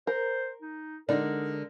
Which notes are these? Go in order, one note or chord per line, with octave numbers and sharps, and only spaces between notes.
A#4 C5
D#4
D3 G#3 D#4 A#4 D5